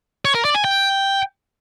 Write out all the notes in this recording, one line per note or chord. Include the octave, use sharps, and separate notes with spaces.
C#5
A#4
D5
G#5
G5